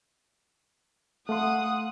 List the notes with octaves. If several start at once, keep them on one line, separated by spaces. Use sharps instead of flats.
A3 F5 F#5 C6 D#6